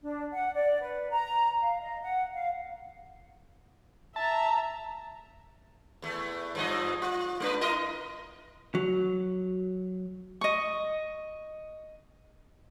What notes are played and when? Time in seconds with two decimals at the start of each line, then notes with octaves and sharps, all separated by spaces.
0.02 D4
0.33 F#5
0.55 D5
0.81 B4
1.10 A#5
1.59 F5
1.81 D#5
2.01 F#5
2.33 F5
4.16 E5 A5 A#5
6.02 E2 A3
6.55 G2 F3 D#5
7.02 F4
7.40 G#3 D4 B4
7.61 E4 A#4 D#5
8.75 F#3
10.41 D#5 C#6